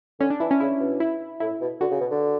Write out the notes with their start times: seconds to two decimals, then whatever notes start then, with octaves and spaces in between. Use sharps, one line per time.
0.20 D3 C#4
0.30 D4
0.40 E3 E4
0.51 C#4
0.60 C#3 E4
0.80 B2
1.00 E4
1.40 A2 E4
1.61 B2
1.81 D3 F#4
1.91 C#3
2.00 B2
2.10 D3